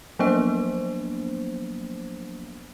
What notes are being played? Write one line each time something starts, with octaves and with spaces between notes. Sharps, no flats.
F3 F#3 A#3 B3 D4 C5